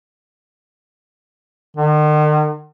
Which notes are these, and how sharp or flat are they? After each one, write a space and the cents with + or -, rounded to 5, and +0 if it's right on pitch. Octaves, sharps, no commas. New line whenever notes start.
D#3 -45